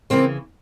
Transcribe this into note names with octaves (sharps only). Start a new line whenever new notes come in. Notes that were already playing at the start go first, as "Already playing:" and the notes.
C#3 E3 A#3 C4